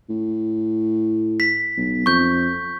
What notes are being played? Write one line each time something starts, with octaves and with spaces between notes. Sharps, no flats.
A2
B6
B1
F2 C#6 G6